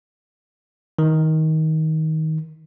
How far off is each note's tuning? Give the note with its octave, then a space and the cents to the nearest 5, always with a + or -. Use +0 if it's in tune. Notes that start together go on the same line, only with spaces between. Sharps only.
D#3 +20